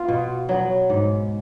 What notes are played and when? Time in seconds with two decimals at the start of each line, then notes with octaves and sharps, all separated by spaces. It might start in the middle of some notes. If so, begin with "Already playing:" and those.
Already playing: B3 F4
0.08 B2
0.49 F#3 B3
0.90 G#2